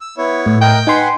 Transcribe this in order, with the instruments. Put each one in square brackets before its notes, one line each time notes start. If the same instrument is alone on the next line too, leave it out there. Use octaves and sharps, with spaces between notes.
[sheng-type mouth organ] E6
B3 E4 C#5
[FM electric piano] A2
[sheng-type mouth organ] A#4 D#5 F#6 [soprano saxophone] G5
[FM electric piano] D#4 C6 [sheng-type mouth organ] B4 F#5 G#5